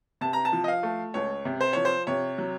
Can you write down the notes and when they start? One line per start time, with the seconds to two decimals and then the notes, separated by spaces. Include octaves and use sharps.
0.21 C3 A5
0.33 A#5
0.45 A5
0.53 F3
0.64 D#5
0.68 F5
0.83 A3
1.14 C#2 C#5
1.45 C3
1.61 C5
1.73 F3 C#5
1.85 C5
2.07 C3 C#5
2.38 F#3